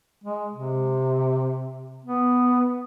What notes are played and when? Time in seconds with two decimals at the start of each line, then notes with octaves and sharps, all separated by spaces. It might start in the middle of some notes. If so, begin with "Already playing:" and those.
0.24 G#3
0.53 C3
2.05 B3